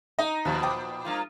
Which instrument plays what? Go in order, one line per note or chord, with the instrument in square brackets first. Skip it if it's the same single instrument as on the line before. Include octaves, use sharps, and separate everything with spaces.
[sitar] D#4 [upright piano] D#5
[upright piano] D#2 [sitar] A#2 F3 B3
[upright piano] G5 D6 D#6
[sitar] G2 A#3 F4